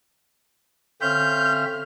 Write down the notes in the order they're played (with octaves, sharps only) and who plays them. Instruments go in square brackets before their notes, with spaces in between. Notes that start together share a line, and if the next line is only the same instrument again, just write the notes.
[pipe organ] D3 C4 E5 [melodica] C#4 C5 F5 [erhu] F6 [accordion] G6